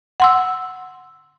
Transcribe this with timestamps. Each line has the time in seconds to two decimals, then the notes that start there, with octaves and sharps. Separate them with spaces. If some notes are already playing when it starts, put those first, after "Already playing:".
0.20 F#5 C6 E6